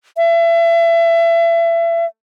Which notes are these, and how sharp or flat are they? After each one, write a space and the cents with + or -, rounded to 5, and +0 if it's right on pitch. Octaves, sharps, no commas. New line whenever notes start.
E5 +30